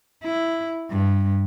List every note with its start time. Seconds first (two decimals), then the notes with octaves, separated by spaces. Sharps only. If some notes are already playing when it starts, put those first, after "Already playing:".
0.23 E4
0.91 G2